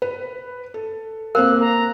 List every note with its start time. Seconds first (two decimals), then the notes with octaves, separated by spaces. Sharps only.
0.02 B4
0.74 A4
1.35 A#3 C4 A#4 F5 F#6
1.60 A#5